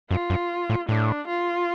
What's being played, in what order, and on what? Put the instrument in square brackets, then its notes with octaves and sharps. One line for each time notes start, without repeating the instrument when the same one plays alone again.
[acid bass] F#2 [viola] F4
[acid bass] F#2
A2
[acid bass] A2 [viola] D4
[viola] F4